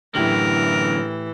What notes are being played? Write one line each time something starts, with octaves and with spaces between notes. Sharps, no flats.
F#2 A2 D3 E3 G4 A#4 F#7